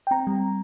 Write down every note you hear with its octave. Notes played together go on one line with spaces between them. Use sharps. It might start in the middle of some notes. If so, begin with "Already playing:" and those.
G5
C4 A#5
G3